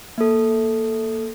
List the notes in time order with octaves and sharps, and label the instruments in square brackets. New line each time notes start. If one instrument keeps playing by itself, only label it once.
[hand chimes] A#3 A4